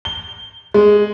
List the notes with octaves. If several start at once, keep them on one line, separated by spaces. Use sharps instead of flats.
G7
G#3